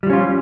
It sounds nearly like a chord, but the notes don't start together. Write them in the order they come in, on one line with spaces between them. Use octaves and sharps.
G3 F3 C#4 F4